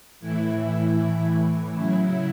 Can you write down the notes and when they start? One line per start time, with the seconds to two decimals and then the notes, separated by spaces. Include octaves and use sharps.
0.20 A2 E3 E4
1.74 C#3 F#3 E4